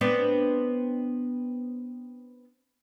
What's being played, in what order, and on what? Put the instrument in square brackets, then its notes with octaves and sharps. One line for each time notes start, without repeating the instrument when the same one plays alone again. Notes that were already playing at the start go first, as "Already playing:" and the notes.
[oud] B3 C4 D4